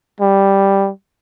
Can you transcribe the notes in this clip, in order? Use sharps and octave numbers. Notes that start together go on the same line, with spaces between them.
G3